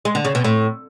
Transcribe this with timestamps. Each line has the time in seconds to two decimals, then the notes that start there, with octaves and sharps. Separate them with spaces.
0.05 G#3
0.15 D3
0.25 C#3
0.35 B2
0.44 A2